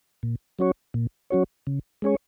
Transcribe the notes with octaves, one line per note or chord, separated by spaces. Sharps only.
A#2
F#3 C#4 F#4 C#5
A#2
F#3 C#4 F#4 C#5
C#3
G#3 C#4 G#4 C#5